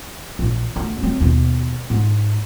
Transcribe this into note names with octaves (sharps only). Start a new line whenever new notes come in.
A#1 E3
D2
F#3 C4
D#2 B2
G#2